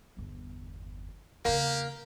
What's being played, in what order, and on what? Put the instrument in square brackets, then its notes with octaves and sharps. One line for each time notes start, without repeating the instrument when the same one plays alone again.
[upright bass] G1 E2
[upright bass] E2 C#3 [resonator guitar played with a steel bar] A#3 [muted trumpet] G4